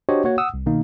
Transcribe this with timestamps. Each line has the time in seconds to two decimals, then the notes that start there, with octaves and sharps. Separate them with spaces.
0.09 D4 F#4 G4 C5 C#5 D#5
0.24 A#3 F#4 C#5
0.38 F#5 D#6 E6
0.54 C2
0.66 B2 D#3 A#3 D#4